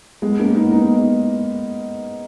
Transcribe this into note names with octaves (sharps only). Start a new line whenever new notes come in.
G#3 B3
A#3 C#4
B3 D#4
B3 D#4